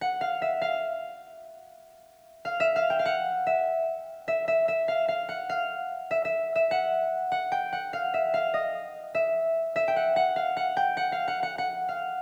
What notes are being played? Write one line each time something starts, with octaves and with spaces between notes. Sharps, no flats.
F#5
F5
E5
F5
F5
E5
F5
G5
F5
F#5
E5
E5
E5
E5
F5
F5
F#5
F5
E5
E5
E5
F#5
F#5
G5
F#5
F5
E5
F5
D#5
E5
E5
G5
F#5
F#5
F5
F#5
G5
F#5
F5
F#5
F#5
F#5
F5